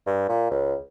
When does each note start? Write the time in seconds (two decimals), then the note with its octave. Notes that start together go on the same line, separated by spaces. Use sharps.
0.07 G2
0.29 A#2
0.51 C#2